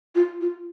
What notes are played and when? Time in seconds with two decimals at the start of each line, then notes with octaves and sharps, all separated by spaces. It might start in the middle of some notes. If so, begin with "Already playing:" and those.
0.15 F4
0.41 F4